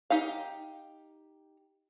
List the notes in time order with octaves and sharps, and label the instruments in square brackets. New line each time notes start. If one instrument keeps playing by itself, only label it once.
[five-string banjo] D#4 G4 F5